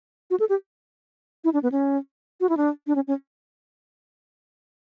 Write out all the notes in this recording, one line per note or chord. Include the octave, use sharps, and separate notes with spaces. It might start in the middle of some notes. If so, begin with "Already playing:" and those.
F#4
A4
G4
E4
D4
B3
C#4
F#4
E4
D4
D4
C#4
C#4